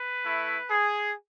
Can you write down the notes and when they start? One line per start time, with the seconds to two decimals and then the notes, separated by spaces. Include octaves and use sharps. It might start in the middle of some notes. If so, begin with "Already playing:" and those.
Already playing: B4
0.25 A3 E4
0.71 G#4